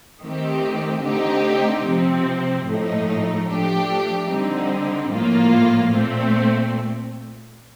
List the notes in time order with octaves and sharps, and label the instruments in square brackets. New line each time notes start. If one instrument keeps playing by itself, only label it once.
[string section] D#3 A3 C4 G4
D3 A3 C4 D#4 G4
C3 F3 C4
A2 F3 A3 D#4
F3 A3 D4 G4
D3 G3 C4 D#4
A2 F3 A#3 F4
A#2 A3 C4